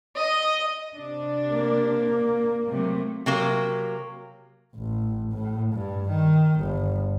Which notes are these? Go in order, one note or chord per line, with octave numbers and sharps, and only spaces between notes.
D#5
C3 D4
A#3
C3 F#3 A3
C3 F#3 A#3
A1
A2
G2
D#3
G1